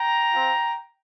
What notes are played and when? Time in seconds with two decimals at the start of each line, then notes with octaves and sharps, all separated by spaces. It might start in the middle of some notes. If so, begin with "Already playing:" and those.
Already playing: G5 A#5
0.32 C4 F4